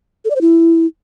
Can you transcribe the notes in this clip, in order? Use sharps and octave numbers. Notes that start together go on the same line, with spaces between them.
A4
D5
C5
E4